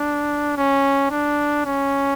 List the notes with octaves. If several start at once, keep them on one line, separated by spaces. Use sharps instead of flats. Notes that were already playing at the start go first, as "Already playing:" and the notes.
Already playing: D4
C#4
D4
C#4